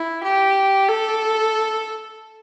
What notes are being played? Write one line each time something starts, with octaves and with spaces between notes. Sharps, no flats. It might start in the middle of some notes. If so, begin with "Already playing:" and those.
Already playing: E4
G4
A4